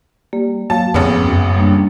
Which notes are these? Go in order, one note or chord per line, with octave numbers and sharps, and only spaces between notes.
G3 A#3
F#3 A#3 F5 A5
A1 F2 C#3 B3
F#2
G3 A#3 D4